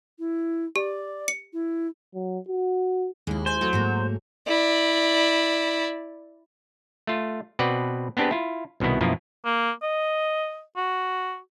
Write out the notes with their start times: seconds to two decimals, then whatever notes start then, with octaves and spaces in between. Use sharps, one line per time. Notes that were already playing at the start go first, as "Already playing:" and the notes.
0.19 E4
0.76 G4 D5
1.28 C#7
1.53 E4
2.14 F#3
2.48 F#4
3.27 D#2 G#3 E4
3.46 C5 G#5
3.61 F#3 A3
3.73 G#2 A3 A#3
4.48 E4 D5
7.07 A3 F4
7.59 B2 C4 B4 D5 F#5
8.17 B3 C4 D4 G4 G#4 B4
8.31 E4 F4
8.80 C2 B2 D#3 B3 E4
9.01 F#2 B2 F3 A#3 E4 F4
9.45 A#3
9.82 D#5
10.76 F#4